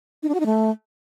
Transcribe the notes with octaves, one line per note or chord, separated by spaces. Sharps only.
D#4
D4
F#4
D#4
A3